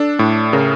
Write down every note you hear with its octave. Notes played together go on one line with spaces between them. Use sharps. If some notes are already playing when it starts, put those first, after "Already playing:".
Already playing: D4 A4
A2
C#3 A#4